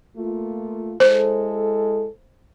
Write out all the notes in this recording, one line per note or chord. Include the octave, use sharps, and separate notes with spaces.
A3 A#3 F4
G#3 E4 A4 C5